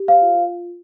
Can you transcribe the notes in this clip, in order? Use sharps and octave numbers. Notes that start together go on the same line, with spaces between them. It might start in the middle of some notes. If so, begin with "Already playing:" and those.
Already playing: G4
C5 F5
F4
F4